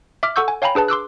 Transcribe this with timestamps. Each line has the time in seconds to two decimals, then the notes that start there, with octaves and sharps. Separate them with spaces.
0.23 E5 D6 F6
0.36 A4 F#5 C#6 E6 G6
0.48 G#5
0.62 C#5 F5 G5 G#5 A#5 B5
0.75 D4 G#4 B4 A5
0.88 C6 D6 E6 F#6